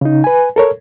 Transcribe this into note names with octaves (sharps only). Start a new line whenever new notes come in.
C#3 D#4
B4 G#5
A4 A#4 C#5